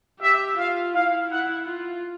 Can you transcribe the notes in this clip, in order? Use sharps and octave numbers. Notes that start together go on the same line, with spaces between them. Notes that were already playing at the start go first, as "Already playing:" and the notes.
G4 E5
F4 F5
E4 F5
E4 F#5
F4